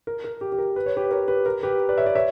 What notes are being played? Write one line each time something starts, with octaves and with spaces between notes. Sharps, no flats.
A#4
A#4
G4
G4
A#4
B4
C#5
G4 B4
A#4 C#5
G4 B4
A#4
G4 B4
B4 D5
C#5 E5
B4 D5
C#5 E5